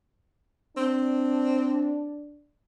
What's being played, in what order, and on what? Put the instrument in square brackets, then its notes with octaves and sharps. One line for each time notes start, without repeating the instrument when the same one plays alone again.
[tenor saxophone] C4 [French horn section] D4